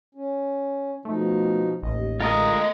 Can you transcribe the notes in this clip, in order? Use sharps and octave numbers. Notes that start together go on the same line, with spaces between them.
C#4
B2 F3 A3 D#4
A1 D#2 D#5
D3 G#3 A3 F4 A#4 D#5 D#6